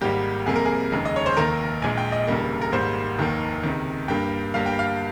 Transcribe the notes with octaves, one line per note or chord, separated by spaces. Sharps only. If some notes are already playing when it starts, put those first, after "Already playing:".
G#1 G#2 G3 A#3 G4
F2 C3 G3 A#3 G#4
A#4
G#4
F1 D#2 C#3 G#3
D#5
C#5
C5
F1 D#2 D#3 A#3 A#4
A#1 A#2 G#3 G#5
G5
D#5
F1 D#2 C#3 G3 A#3
A#4
G#1 G#2 G3 A#3 C5
F1 D#2 D#3 A#3
C#2 C3 D#3
G2 G3 A#3 G5
G1 G2 G3 A#3 F5
G5
F5